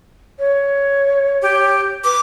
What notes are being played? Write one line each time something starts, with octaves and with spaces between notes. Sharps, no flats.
C#5
G4
B4 D6